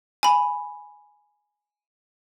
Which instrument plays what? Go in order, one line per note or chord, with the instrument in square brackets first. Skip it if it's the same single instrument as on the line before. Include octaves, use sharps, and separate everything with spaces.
[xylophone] G#5 B5